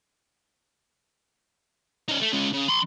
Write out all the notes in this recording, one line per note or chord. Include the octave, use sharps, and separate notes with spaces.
C#4 D#4
A3
G#3 C#4
C#3
B5 C6